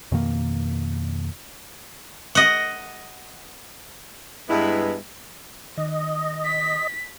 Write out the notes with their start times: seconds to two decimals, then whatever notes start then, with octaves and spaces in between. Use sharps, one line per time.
0.12 F2 B2 D#3 A#3
2.35 D#5 F#5
4.49 G2 G#3 B3 E4
5.78 D#3 D#5
6.45 B6